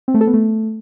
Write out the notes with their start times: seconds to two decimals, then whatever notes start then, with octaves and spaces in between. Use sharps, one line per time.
0.08 C4
0.14 A3
0.21 A4
0.27 B3
0.34 A3